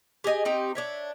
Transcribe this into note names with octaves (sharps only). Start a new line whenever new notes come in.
G4 G#4 D#5 G#5
C4 D#4 G4
D4 C#5 E5